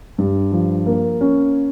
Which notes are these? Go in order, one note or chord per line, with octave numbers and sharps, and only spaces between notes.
G2
F3
A#3
C#4